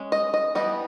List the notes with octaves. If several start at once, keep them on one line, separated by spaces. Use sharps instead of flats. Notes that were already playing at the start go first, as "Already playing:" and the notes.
Already playing: G#3 C#4
D#5
D#5
E3 G3 B3 D#5